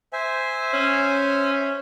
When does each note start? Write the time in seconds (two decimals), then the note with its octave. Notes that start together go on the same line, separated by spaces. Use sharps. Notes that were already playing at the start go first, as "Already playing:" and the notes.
0.13 C5 E5 G#5
0.73 C#4